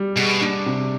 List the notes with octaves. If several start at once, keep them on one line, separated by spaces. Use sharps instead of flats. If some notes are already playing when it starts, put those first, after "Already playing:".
Already playing: G3
B2 G#4
D4
C3